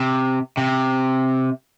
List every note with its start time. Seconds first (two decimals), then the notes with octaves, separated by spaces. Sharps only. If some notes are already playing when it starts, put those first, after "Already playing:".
Already playing: C3
0.57 C3